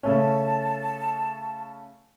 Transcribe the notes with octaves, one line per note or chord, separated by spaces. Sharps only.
C#3 A3 C#4 A5